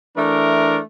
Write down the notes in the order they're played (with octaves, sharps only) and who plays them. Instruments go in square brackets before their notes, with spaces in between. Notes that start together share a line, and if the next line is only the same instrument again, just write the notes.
[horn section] E3 A3 D4 A#4